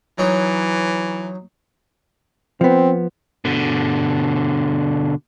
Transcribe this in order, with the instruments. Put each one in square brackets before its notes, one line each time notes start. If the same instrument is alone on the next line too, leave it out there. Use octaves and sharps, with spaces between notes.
[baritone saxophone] E3 [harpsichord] F#3 D#4 C#5
[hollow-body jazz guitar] F3 B3 [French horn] C4
[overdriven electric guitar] B2 D3